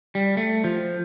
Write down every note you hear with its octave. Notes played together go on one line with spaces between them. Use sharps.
G3
A3
F3